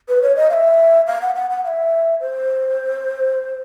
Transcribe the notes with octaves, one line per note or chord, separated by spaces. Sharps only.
B4
C#5
D#5
F5
E5
F5
F#5
F#5
F#5
F5
E5
C5